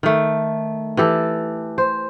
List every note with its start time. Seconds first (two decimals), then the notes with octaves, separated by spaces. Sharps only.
0.03 D#3 A3
0.97 E3 G4 A4
1.78 C5